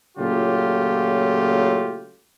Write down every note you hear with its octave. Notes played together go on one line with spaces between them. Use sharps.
A#2 C#3 F#3 A3 F4 G4